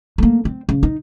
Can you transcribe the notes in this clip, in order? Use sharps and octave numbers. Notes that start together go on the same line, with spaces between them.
A3 A#3
C4
C#3
D#4